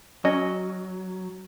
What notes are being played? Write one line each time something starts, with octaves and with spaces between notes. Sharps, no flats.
F#3 C#4 D#5